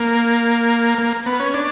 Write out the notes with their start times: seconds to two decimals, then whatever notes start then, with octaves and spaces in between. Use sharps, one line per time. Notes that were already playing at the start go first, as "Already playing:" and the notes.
Already playing: A#3
0.98 A#3
1.26 B3
1.40 C#4
1.54 D4